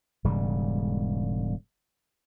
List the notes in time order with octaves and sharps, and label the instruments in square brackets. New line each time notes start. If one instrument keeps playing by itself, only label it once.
[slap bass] E1 G#2 C#3 G3